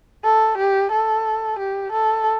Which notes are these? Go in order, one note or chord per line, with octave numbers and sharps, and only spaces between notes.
A4
G4
A4
G4
A4